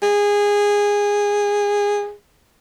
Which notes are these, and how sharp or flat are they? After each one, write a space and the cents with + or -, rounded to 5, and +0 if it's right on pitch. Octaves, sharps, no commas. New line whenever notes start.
G#4 -20